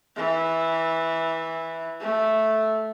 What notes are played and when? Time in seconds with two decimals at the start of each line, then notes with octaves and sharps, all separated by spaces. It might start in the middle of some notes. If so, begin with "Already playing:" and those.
0.16 E3
2.01 A3